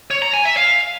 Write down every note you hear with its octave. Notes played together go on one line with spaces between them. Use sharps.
C#5
A#5
G#5
E5
F5